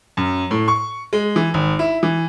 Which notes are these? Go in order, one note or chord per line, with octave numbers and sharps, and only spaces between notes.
F#2
A2
C#6
G#3
E3
G#1
E4
E3